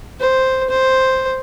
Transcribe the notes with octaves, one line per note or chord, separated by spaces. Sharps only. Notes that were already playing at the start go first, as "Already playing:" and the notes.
C5
C5